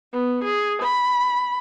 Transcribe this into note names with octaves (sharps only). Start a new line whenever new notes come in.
B3
G#4
B5